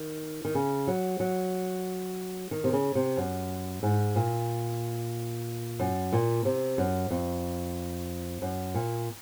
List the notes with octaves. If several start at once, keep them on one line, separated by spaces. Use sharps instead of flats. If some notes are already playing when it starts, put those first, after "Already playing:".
Already playing: D#3
D#3
C#3
F#3
F#3
D#3
C3
C#3
C3
F#2
G#2
A#2
F#2
A#2
C3
F#2
F2
F#2
A#2